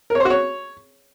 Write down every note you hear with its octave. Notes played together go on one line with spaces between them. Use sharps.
A#4
C#5
C5
F#4
C#5